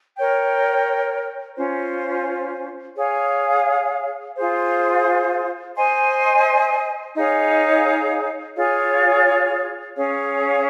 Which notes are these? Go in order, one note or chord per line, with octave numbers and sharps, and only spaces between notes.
A#4 C#5 G5
C#4 F4 C5
G#4 C#5 F5
F4 G#4 C5
C5 D#5 G#5 C6
D#4 G#4 C#5 F5
F4 G#4 C#5 F5
C#4 G#4 C#5 F5